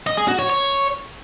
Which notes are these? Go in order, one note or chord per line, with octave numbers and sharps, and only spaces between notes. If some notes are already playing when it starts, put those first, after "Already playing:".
D#5
G#4
F#4
C#5
C#5